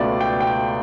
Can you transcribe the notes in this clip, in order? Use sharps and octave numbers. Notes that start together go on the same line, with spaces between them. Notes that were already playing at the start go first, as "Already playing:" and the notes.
Already playing: C#2 B2 A3 D5
G5
G5